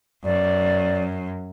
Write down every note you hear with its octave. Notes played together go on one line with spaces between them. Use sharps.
F#2 D5